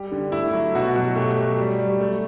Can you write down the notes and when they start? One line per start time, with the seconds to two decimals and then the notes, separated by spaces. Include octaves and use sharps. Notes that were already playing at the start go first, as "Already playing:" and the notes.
Already playing: G3 G4
0.11 D3
0.32 A3 E4
0.53 F#3
0.75 B2 F#4
0.96 F#3 F#4
1.16 A3 G4
1.37 F#3
1.58 G3
1.79 G3
2.00 A3